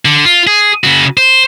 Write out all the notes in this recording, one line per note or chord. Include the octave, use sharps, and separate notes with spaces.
D3
F4
G#4
C#3 F#4
C5